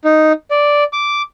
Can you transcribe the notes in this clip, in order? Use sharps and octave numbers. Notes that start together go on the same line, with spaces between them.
D#4
D5
D6